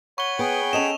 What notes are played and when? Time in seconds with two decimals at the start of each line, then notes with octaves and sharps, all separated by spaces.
0.18 C#5 F#5 B5 C#6 G7
0.39 B3 G#4 G5
0.73 C#4 A4 D#5 E7 F7